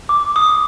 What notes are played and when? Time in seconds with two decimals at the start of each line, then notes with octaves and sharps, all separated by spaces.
0.09 D6
0.36 D#6